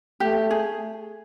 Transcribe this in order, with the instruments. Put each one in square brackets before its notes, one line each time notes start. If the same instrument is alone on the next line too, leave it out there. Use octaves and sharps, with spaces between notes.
[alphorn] A3 [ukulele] G4
[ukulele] G#4